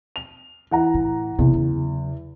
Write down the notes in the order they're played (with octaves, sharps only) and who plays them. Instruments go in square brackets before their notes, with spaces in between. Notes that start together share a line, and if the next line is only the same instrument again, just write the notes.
[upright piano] F7
E3 F#5 A#5
[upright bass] A2
[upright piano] E2 [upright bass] C3 F#3
[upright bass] C#3 F#3